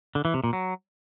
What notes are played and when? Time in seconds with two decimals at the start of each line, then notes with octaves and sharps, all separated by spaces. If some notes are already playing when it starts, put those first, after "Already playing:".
0.15 D3
0.25 E3
0.34 C3
0.44 A#2
0.53 F#3